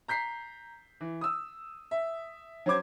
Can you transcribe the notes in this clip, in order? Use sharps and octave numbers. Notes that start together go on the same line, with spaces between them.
A#5 G6 B6 C7
E3
D#6 E6
E5
F#3 C#4 C5 D6 G#6